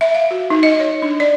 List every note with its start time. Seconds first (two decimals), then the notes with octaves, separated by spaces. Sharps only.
0.01 E5
0.15 F5
0.31 F#4
0.50 D#4
0.63 D#5
0.80 C#5
1.02 D4
1.20 D5